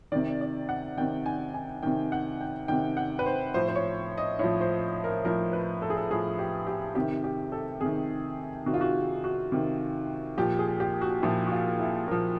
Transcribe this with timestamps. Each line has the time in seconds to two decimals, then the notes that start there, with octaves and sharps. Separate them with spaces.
0.12 C3 D#3 D5
0.41 D5
0.69 F#5
0.97 C3 D#3 G5
1.26 G#5
1.54 G#5
1.83 C3 D#3 G5
2.12 F#5
2.41 G5
2.68 C3 D#3 G5
2.97 F#5
3.19 B4
3.26 C5
3.54 A2 F3 C5
3.69 C5
3.76 C#5
4.18 D#5
4.39 A2 F3 C#5
4.61 C5
5.04 A#4
5.25 A2 F3 A#4
5.53 B4
5.82 A4
5.90 G#4
5.97 A4
6.10 A2 F3 G#4
6.39 G4
6.67 G4
6.95 C3 D#3 G4
7.24 G4
7.52 A4
7.81 C3 D#3 G#4
8.66 C3 D#3 F#4
8.74 F4
8.81 F#4
9.24 F#4
9.52 C3 D#3
10.37 A#2 F3 G4
10.59 G#4
10.80 G4
11.01 F#4
11.22 A#2 F3 E4
11.46 F#4
11.52 F4
11.79 E4
12.08 A#2 F3 A#4